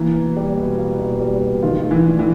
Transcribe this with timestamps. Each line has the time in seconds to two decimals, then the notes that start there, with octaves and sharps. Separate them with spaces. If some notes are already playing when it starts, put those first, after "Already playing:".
Already playing: E3 A#3
0.15 B2
0.37 G3
0.57 B2
0.78 A#3
0.99 B2
1.20 G3
1.42 B2
1.63 D#3 F4
1.83 A3
1.91 E3
2.05 D4
2.19 E3